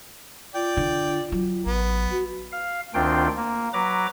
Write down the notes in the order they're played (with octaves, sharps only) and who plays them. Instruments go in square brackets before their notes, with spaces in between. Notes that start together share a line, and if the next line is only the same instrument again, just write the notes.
[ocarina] F4 [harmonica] D5 G5
[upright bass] D3
F#3
[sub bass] A1 [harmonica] B3
[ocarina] F#4
[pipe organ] F5
D2 D#3 C4 D4 F4 G5
A#3
F#3 B4 A#5 D6